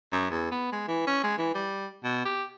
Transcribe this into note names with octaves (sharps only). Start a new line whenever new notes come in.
F#2
E2
B3
G#3
E3
C#4
G#3
E3
G3
B2
G4